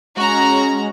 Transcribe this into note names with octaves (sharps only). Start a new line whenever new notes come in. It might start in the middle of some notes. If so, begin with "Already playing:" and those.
G#3 C#4 F#4 A#5